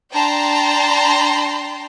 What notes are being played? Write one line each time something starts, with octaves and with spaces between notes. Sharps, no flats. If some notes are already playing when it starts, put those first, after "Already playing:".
D4 G5 A5 A#5 C6